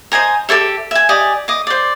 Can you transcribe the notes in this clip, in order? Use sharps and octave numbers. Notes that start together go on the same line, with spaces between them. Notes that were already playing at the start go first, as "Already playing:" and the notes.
C5 D#5 G#5 A#5
G4 A4 C#5 E5
E5 G#5
G4 D5 D#5 G#5
D#5 D6
C5 D5